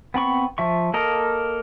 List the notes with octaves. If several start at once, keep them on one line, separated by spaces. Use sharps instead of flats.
B3 C4 B5 C#6
F3 E5 C#6
A#3 A4 A#4 D#5